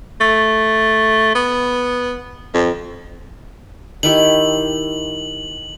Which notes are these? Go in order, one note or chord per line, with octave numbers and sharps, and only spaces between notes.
A3
B3
F2
D#3 E4 G4 F#7